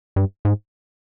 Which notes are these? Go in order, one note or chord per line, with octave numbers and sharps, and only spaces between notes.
G2
G#2